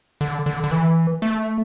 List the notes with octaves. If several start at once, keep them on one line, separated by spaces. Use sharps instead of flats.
D3
D3
D3
E3
A3